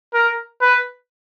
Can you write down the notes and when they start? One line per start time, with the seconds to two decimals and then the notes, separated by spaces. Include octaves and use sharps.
0.14 A#4
0.61 B4